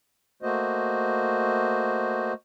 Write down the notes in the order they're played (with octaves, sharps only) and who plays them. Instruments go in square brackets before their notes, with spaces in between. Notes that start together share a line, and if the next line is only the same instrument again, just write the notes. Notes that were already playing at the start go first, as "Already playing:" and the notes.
[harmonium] A3 A#3 F#4 C5 D#5